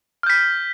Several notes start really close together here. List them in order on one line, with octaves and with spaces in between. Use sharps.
F6 G6 B6